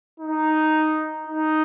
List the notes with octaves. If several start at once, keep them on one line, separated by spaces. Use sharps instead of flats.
D#4
D#4